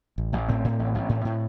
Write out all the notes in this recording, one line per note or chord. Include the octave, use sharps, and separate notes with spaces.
A1
A1
A2 C4
A2
A1
A1
A2
A2